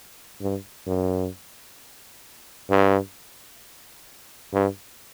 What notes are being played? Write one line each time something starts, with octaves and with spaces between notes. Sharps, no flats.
G2
F#2
G2
G2